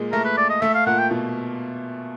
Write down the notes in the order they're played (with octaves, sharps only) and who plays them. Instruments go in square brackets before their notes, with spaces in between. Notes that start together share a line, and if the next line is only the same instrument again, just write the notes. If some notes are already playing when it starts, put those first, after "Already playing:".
Already playing: [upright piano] A#2 G#3 A#3
[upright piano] A3 [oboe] A#4
[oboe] B4
D5
D#5
[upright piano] A3 [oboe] E5
[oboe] F5
[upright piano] A#2 A#3 [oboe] F#5
[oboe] G5
[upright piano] B2